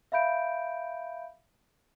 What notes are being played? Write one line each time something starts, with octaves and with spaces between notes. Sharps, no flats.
E5 F5 B5 G6 D7